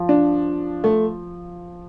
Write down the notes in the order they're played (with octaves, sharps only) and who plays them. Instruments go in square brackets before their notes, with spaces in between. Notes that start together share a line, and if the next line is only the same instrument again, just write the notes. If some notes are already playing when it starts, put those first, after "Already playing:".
Already playing: [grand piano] F3
[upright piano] D4
A3